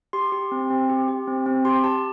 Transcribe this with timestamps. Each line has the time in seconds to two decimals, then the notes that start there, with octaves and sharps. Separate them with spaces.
0.13 G4 C6
0.32 G4
0.52 C4
0.70 C4
0.90 G4
1.08 G4
1.27 C4
1.46 C4
1.65 G4 C6
1.84 G4 A5